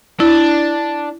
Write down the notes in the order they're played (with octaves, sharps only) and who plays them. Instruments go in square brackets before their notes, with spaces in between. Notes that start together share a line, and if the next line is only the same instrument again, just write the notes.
[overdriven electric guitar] D4 [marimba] E4